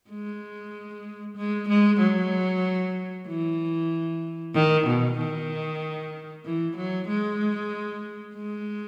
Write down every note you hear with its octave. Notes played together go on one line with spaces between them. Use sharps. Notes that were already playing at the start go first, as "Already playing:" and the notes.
G#3
G#3
G#3
F#3
E3
D#3
B2
D#3
E3
F#3
G#3
G#3